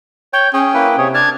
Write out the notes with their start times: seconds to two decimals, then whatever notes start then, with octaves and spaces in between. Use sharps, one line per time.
0.33 C#5 G5 G6
0.54 C#4 G#4 G5
0.74 A#3 E4 B4
0.98 C3 G#4 C#5
1.14 D4 A5 F6 G#6